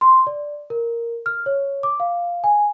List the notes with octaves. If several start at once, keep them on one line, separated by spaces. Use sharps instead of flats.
C6
D5
A#4
F6
C#5
D6
F5
G#5